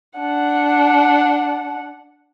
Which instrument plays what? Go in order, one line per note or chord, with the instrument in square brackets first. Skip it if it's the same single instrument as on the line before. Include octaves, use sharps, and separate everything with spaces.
[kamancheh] D4 F#5